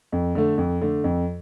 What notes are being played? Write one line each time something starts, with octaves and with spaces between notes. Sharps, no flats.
F2
D3 A3
F2
D3 A3
F2